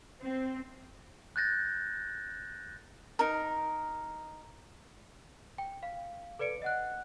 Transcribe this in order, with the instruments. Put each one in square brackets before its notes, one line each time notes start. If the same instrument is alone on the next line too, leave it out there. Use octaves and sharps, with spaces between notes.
[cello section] C4
[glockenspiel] F#6 G6 A6 A#6
[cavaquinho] D#4 A#4
[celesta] G5
F5
A4 B4 D5 C#7 D7
D#5 F#5 F#6